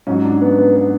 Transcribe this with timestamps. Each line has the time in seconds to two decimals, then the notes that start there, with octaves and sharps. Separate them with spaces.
0.07 G#2 F#3 C#4
0.25 D4
0.42 B3
0.59 B3
0.76 B3